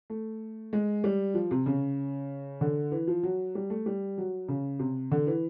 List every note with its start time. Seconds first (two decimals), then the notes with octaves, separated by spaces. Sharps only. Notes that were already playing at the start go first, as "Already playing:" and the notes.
0.10 A3
0.73 G#3
1.04 G3
1.34 F3
1.51 C3
1.66 C#3
2.61 D3
2.92 E3
3.07 F3
3.23 F#3
3.55 G3
3.70 A3
3.86 G3
4.18 F#3
4.49 C#3
4.79 C3
5.12 D3
5.27 E3